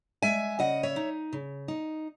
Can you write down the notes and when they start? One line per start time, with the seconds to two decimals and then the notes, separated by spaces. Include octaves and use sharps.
0.22 G#3 E5 G#5
0.59 C#3 D#5 F#5
0.83 C#5 E5
0.96 D#4
1.33 C#3
1.68 D#4